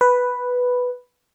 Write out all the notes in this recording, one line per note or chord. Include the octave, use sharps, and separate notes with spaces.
B4